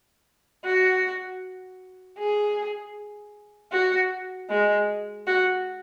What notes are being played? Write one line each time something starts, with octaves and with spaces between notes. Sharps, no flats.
F#4
G#4
F#4
G#3
F#4